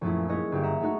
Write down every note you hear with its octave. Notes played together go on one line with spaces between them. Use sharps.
A#1 F#2 A3 E4
G#3 A#3 E4 B4 C#5 D#5
G1 G4
E5 F#5 A#5 D#6
G#3 A3 D#4 F#4